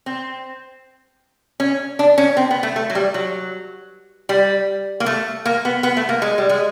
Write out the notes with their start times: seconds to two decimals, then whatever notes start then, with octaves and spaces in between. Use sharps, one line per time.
0.06 C4
1.60 C#4
1.99 D4
2.18 C#4
2.37 C4
2.51 B3
2.63 A3
2.76 A3
2.90 F#3
2.95 G3
3.14 F#3
4.29 G3
5.00 A#3
5.06 A3
5.45 A#3
5.65 B3
5.83 B3
5.97 A3
6.09 A#3
6.22 G#3
6.38 G3
6.49 G#3